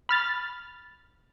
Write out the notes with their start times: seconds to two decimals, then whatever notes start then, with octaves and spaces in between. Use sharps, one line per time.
0.09 B5 F6 A6